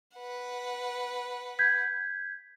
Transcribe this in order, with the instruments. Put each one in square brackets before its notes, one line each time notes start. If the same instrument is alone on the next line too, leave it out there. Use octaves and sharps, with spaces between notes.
[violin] B4 F#5
[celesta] G6 G#6 B6